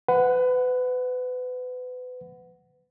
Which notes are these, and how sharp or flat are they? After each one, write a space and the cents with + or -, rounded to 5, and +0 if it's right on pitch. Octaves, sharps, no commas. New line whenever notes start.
B4 +30 F#5 +0